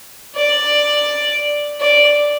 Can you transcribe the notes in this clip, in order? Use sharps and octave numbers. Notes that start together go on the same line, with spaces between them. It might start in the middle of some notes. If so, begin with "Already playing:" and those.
D5
D5